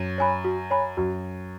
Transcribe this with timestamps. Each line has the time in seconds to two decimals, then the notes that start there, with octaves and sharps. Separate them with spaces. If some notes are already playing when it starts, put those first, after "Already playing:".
Already playing: F#2
0.18 C#5 G#5 B5
0.45 F#4
0.71 C#5 G#5 B5
0.97 F#2 F#4